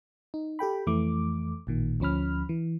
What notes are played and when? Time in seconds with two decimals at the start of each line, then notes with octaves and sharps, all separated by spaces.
0.34 D#4
0.59 G4 A4 G5 B5
0.87 F2 E3 A3 D6
1.67 A1 A#2 D#3
2.00 D2 F3 C#4 B5 F6
2.49 E3